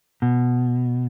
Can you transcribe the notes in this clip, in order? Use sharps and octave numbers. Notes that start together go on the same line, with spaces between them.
B2